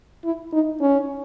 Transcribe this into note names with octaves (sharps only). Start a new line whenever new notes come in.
E4
D#4
C#4